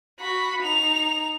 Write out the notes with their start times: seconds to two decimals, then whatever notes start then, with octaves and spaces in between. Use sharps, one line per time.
0.20 F#4 B5
0.63 D#4 F7